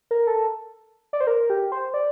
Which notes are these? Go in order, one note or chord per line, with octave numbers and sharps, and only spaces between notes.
A#4
A4
D5
C5
A#4
G4
C5
D5